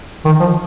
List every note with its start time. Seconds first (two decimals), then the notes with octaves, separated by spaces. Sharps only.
0.25 D#3
0.40 F3